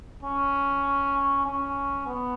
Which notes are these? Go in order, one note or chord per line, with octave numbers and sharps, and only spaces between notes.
C#4
C#4
B3